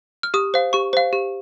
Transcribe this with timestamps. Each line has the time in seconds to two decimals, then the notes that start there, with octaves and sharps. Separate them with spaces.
0.23 F6
0.34 G4 D#6
0.54 C5 F5
0.73 G4 C#6
0.93 C5 F5
1.13 G4